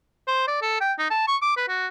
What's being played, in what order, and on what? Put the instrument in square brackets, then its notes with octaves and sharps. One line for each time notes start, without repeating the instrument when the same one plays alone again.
[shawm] C5
D5
A4
G5
D#4
A5
C#6
D6
B4
F#4